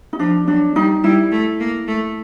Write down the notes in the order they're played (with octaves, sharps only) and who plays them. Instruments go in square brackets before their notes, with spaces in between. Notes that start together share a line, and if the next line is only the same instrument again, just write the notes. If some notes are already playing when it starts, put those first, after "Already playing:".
[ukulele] D#4
[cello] F3 [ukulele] D4
[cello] F#3 [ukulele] D4
[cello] G3 [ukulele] D#4
[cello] G3 [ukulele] E4
[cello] A3
A#3
A3